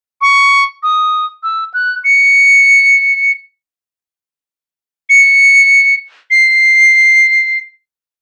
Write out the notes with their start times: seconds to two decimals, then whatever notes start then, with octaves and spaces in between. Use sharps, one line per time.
0.21 C#6
0.83 D#6
1.43 E6
1.74 F#6
2.04 C#7
5.10 C#7
6.31 C7